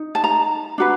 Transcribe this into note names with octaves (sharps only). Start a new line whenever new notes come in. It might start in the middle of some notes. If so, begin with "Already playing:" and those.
Already playing: D#4
A5
A#5
D4 F#4 B4